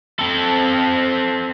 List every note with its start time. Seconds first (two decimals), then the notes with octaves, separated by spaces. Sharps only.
0.19 C4 A4